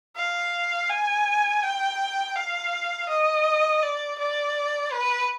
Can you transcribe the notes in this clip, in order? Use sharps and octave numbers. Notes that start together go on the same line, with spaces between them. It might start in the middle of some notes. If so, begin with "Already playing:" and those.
F5
G#5
G5
F5
D#5
D5
D5
B4